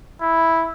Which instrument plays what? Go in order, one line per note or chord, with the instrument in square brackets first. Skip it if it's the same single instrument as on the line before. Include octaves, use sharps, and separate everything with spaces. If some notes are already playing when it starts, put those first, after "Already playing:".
[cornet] E4